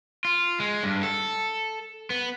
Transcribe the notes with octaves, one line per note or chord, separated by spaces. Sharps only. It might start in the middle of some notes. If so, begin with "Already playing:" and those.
F4
G#3
G2
A4
B3